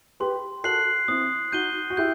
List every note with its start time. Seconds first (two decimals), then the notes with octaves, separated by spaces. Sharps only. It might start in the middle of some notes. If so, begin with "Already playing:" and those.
0.20 G4 B4 C6
0.64 F#4 A4 F#6 C7 F#7
1.08 C4 E4 D#6
1.52 D#4 F#4 G6 D#7 G7
1.90 F#4
1.97 E4 G4 G6